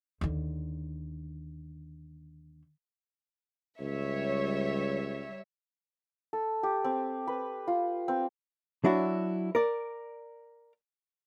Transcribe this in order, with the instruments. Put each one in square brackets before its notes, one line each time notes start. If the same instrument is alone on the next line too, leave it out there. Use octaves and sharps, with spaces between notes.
[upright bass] D#2 D3
[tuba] C#2 [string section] G3 C#5 E5
[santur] A4
G4
C4
B4
F4
C4
[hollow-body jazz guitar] F#3 D4 E4 F#4
A#4 D5